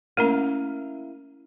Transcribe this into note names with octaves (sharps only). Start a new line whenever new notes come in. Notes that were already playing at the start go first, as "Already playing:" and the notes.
A3 A#3 C#4 E4 A#4 F5